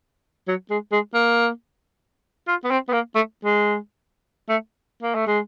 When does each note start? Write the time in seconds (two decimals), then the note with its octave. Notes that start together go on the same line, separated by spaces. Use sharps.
0.48 F#3
0.70 G#3
0.92 G#3
1.14 A#3
2.48 F4
2.64 B3
2.71 C4
2.88 B3
2.93 A#3
3.15 A3
3.44 G#3
4.49 A3
5.03 A#3
5.15 A3
5.27 G#3